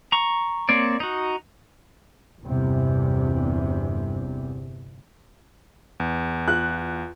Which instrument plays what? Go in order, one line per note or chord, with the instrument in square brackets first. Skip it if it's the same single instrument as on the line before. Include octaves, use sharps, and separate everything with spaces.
[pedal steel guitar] A#5 C#6
A#3 C4 C#5 D5
D#4 F#4
[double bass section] G1 E2 C3
[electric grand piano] E2
[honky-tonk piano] F4 F#6